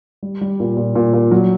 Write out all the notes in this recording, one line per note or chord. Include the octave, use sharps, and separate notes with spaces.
G3
G3
A#2
A#2
A#2
A#2
F#3